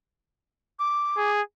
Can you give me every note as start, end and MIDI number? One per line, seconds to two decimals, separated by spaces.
0.79 1.31 86
1.17 1.41 68